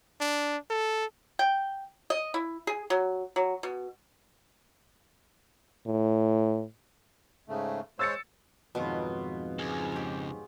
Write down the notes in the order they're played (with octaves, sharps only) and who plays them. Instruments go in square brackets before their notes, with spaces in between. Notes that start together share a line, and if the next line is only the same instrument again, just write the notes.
[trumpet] D4
A4
[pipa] G5
D#5
E4
G#4
F#3
F#3
B2
[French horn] A2
[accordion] G#2 C#3 A3
[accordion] G#3 C5 C#5 [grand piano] E6 A6 C#7
[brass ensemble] F2 G#2 [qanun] B2 D#3 F#3 [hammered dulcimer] B3 F4
[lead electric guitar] C#2 [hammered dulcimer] G#4
[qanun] G4 C#5